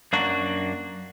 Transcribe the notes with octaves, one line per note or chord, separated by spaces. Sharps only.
F#2 A#3 D4 F#4